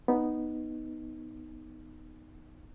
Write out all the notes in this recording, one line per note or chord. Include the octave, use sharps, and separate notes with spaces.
B3 D#4